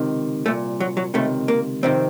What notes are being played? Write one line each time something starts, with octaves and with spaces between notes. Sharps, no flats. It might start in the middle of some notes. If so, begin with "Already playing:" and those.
Already playing: C#2 C3 D#3
C2 A#2 A3
F#3
F#3
C#2 C3 D#3 A3
A#3
F2 C3 D#3 C4